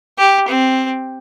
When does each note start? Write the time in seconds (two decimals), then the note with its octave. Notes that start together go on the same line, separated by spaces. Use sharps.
0.18 G4
0.47 C4